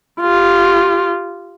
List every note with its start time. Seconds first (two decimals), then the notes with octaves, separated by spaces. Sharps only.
0.21 F4 G4